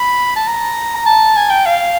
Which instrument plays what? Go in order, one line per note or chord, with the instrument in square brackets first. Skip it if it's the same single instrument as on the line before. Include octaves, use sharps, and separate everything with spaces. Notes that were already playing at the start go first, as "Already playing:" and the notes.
Already playing: [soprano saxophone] B5
A5
A#5
A#5
A5
G#5
G5
F5